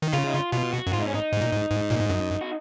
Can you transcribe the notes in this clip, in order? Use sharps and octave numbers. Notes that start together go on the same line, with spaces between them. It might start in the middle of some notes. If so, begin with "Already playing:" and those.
D#3
C#3 F4
D#4
F4
B2 F4
F#4
F#2
G#2 F4
D#4
C#4
D#4
G#2
A#2
G#2
G#2
A#2
G#2
F#2
F#4